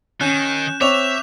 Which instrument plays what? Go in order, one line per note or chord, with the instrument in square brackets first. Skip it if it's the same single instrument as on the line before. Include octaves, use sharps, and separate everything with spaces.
[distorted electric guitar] D#3 [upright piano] C#4 [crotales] F#6 G6 E7
[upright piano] C4 C#5 [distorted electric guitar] E5 [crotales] D6 F7